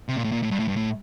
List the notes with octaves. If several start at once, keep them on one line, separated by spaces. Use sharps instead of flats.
C3
A#2
A2
A#2
A2
G2
A2
G2
A2